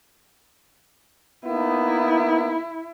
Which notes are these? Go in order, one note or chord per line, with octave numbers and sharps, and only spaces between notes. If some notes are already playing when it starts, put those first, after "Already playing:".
A#3 B3 D#4 E4